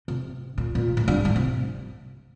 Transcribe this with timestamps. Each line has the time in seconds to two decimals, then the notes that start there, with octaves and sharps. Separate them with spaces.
0.08 C3
0.58 A#2
0.75 A#2
0.97 A2
1.08 G2
1.25 A2
1.36 C3